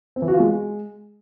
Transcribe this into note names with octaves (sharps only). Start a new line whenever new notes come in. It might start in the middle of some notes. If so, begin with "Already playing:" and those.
C4
E3
F#4
F4
G#3